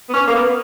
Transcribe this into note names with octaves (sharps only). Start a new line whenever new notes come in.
B3
C#4
A#3
B3